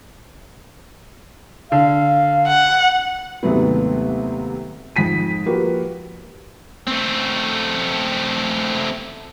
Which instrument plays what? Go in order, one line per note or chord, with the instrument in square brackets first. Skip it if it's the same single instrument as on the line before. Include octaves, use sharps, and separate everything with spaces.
[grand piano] D3 [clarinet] F5
[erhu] F#5
[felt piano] D#2 G#2 C3 F#3 A3 B3
F2 G#2 B6 D#7
F3 A#3 F#4 G4 B4
[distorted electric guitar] A3 C4